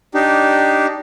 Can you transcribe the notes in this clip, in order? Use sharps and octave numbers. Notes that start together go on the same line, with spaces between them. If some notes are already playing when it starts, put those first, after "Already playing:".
D4 D#4 G4